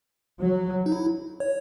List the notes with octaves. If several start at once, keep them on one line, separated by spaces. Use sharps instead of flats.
F#3
D#4
E4
C#5